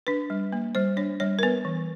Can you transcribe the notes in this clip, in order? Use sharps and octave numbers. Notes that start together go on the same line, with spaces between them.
D4 B4
G3
A#3
G3 C5
D4 C#5
G3 C#5
A#4
B3 B4
E3